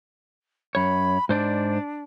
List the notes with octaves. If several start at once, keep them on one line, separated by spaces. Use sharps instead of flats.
F#2 C#5 B5
G#2 D4 C5 D5